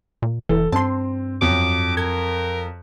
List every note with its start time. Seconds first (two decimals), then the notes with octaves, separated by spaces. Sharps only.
0.22 A#2
0.49 F1 E3 A4
0.72 G2 C4 A5 C6
1.41 F2 F#3 D6
1.97 A#4 G#6